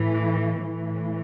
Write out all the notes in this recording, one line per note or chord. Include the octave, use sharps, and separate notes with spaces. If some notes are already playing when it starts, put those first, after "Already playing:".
Already playing: A2 E3
A2 E3